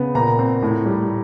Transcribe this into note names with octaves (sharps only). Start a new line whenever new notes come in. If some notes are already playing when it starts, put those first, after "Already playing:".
Already playing: C#3 B3
A#2 A#5
C4
A2
G3